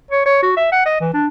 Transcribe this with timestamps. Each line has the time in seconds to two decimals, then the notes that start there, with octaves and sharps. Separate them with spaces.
0.12 C#5
0.26 C#5
0.43 F#4
0.57 E5
0.72 F#5
0.86 D#5
1.01 E3
1.14 D4